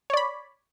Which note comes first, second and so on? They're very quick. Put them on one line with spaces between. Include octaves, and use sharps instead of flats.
C#5 D5 B5